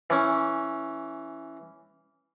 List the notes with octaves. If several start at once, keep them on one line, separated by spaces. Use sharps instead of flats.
E3 C#4